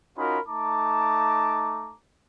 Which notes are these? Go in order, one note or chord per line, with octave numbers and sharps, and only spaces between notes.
C#4 D#4 F4 F#4 A#4 B5
A3 D#4 A5 A#5 D6